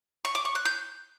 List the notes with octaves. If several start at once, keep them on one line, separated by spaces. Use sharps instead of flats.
C#6
D6
C#6
F#6
G6